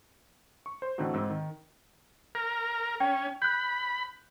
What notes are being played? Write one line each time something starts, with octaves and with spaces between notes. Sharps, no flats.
C#6
C5
A2 D3 E3 C4 D#4 F#4
G#2 C4 E6
D#3
A#4
C#4 G5
B5 F#6 G6